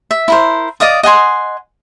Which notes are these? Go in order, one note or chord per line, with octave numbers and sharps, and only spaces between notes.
E5
E4 A#4 C5
D5 D#5 F5 D#6
D#5 F#5 G#5 C6